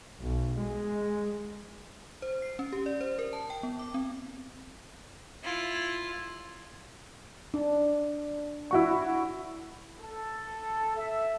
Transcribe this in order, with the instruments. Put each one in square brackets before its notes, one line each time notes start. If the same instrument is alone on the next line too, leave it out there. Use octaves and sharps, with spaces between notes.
[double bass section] B1
G#3
[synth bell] C5
C7
C#4
G4
D5
C5
A#4
A5
G5
B3
D6
C4
[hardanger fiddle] E4 F4
[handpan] D4
[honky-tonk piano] E4 F#4 C#6
[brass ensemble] A4
E5